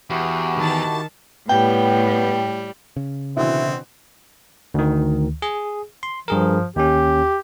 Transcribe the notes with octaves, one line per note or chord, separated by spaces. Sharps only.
E2 E4 F#4 G4
D#3 A5
A2 G3 B3 G5
C#3
B2 D3 E3 C4 E4
D2 D#3
G#4
C6
G2 F3 G#4 A#4
D#2 C#4 G4